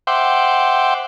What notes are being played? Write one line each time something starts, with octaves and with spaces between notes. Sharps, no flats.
C5 E5 F#5 G5 C6 D6